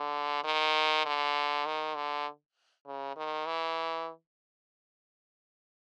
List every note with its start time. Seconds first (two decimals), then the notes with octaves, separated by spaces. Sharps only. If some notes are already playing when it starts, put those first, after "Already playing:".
Already playing: D3
0.44 D#3
1.05 D3
1.66 D#3
1.95 D3
2.86 C#3
3.16 D#3
3.46 E3